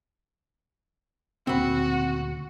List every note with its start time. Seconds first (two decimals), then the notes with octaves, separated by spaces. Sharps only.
1.47 D2 A#2 C#3 C4 F#4 B5